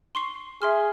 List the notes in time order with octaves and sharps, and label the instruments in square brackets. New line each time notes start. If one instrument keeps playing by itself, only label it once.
[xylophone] C6 C#6 C7
[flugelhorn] G#4 [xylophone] E5 C6 F6